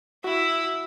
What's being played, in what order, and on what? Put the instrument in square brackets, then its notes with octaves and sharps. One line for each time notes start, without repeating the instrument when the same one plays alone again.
[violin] E4 [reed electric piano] F#4